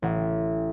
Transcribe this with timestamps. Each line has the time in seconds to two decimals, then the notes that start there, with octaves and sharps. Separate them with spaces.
0.02 A1